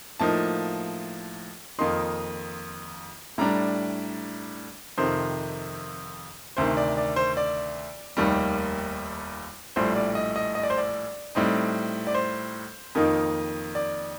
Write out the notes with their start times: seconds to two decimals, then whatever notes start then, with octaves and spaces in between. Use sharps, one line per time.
0.20 A2 F3 A#3 D#4 A5
1.79 F2 D#3 A#3 D#4 C6
3.38 A2 G3 D4 A#5
4.98 F2 C3 D#3 C5
6.57 D2 C3 D#3 C5
6.77 D5
6.97 D5
7.16 C5
7.37 D5
8.17 F1 D#2 D#3 G3
9.76 A#1 A2 G3 C5
9.95 D5
10.15 D#5
10.36 D#5
10.55 D#5
10.63 D5
10.70 C5
10.78 D5
11.35 A2 G3 C4 D#4
12.07 D5
12.14 C5
12.95 F2 D#3 A#3 D#4
13.75 D5